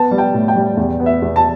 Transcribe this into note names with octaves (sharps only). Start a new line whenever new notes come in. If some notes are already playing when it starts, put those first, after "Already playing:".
Already playing: B3 A5
G3
G5
A2
G5
G3
E2
B3
E5
E2
A5